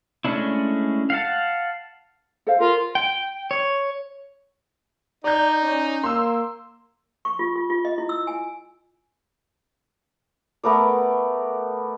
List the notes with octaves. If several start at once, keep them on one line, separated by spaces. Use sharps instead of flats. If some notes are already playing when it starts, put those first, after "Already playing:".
G#3 A3 C#4 D4 E4
F5 F#5 A5
A4 C5 F5
F4 A#4
G5
C#5
D#4 D5 G6
C#4
A#3 C6 E6
C#6
F4
F4
F4
D#5
E4
E6
G#5
A3 B3 A#4 D5